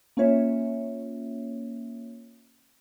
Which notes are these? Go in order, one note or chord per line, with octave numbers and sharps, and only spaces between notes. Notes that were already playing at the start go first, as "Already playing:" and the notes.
A#3 C#4 F4 C#5 E5